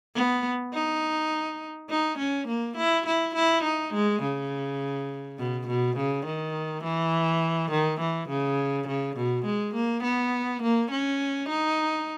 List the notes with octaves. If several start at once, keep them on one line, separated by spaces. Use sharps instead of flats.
B3
D#4
D#4
C#4
A#3
E4
E4
E4
D#4
G#3
C#3
B2
B2
C#3
D#3
E3
D#3
E3
C#3
C#3
B2
G#3
A#3
B3
A#3
C#4
D#4